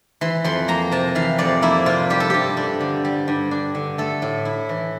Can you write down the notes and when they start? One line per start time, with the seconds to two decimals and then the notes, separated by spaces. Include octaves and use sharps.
0.21 E3 C6
0.44 F2 C6
0.68 A#3 A#5
0.92 C3 A5
1.15 E3 F5
1.38 F2 D5
1.62 A#3 E4
1.86 C3 F4
2.10 G3 G4
2.20 A4
2.30 G2 G4
2.57 D4
2.80 D3
3.05 G3
3.28 G2
3.51 D4
3.75 D3
3.98 A3 A4
4.22 A2
4.45 E4
4.69 E3